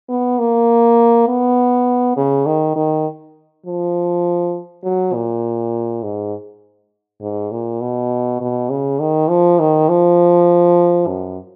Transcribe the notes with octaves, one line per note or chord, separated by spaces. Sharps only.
B3
A#3
B3
C#3
D#3
D#3
F3
F#3
A#2
G#2
G#2
A#2
B2
B2
C#3
D#3
F3
D#3
F3
F#2